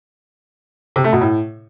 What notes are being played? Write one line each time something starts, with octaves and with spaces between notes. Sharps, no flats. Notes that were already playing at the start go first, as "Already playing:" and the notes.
C3
A3
B2
A2